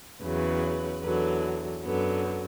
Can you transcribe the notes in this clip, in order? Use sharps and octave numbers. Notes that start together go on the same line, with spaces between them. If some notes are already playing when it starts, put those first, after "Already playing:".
E2 C#3 F#3 B4
E2 D3 F#3 B4
F#2 D3 F#3 B3